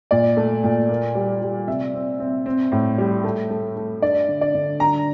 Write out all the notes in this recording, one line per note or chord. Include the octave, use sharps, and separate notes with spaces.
A#2 D5
A3
A#2
A#3
G3
G3
C3 E5
C4
C4
C4
A2
G3
A3
A3
A3
D4 D5
D3
D5
D3
D3 A#5